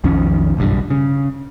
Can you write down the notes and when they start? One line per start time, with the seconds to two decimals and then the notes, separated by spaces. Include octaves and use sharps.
0.04 B1 F2 D#3 C#4
0.57 F#1 B1 G2
0.90 C#3